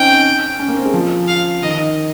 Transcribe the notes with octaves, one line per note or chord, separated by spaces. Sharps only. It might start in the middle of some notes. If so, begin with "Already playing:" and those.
Already playing: C4 C#4 D#4 G5
C#4
A#3
C4
G#3
F3
F5
D#3 D#5